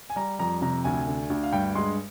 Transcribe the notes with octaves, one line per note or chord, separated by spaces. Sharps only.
G#5
G3 A#5
F2 A#5
C3 A#5
D2 G#5
D3
D2
F5
G2 G5
G#3 C6